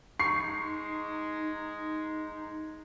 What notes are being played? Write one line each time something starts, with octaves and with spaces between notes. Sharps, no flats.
G#3 D#4 C#6 C7